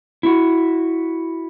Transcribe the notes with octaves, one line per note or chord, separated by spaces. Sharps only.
E4 F#4